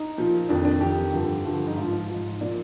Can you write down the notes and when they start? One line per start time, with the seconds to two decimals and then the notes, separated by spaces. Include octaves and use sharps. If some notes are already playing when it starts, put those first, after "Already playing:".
Already playing: D#4
0.18 A#2 F3
0.49 F2 D#3 D4
0.65 D4
0.81 F2 D#3 G4
1.14 G2 D3 F3
1.45 G2 D3 F3
1.68 D#4
1.77 G#2 F3 F4
2.10 G#2 F3
2.41 A#2 F3 D5